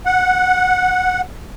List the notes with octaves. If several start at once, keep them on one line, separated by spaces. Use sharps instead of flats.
F#5